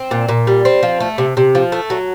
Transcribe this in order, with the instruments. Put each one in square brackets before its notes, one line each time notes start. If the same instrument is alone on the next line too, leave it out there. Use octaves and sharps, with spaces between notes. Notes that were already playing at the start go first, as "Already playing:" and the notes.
Already playing: [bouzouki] C4
A#2
A#2
G3
C4
F3
A3
C3
C3
F3
A3
F#3